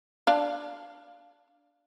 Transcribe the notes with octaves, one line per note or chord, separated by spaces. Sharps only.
D4 F5